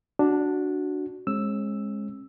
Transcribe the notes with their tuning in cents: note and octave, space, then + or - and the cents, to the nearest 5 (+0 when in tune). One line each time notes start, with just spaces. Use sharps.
D4 +0 F#4 +0
G#3 +0 C#4 -40 E6 +0